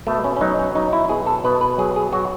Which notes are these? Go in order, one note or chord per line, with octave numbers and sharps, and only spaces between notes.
B2 A3
C#4
C#4
F#3 D#4
C#4
F#3 D#4
E4
B2 G#4
A4
B2 B4
B4
F#3 G#4
G#4
F#3 F#4